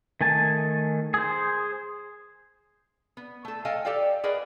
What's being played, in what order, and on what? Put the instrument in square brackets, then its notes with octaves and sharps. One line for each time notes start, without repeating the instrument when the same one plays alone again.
[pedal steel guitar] D#3 A3 G#5 A5
G#4 C5
[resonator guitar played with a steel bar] B3
A3 A4
A4 D#5 F5 G5 G#5
G4 A4 D5 F5 G5
G#4 A#4 B4 D5 D#5 F#5